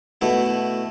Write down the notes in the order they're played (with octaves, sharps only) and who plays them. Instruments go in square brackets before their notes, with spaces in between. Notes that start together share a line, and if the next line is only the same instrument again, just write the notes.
[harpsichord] B2 A3 E4